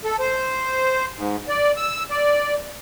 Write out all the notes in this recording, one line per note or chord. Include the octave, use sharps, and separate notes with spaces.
A4
C5
G#2
D5
E6
D5